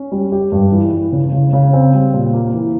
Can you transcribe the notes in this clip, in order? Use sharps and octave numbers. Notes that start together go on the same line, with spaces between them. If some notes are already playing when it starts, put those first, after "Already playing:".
Already playing: C#4
G3
G4
G2
E3
E3
C#3
C#3
C#3
C4
G3
A#2
A#3
E3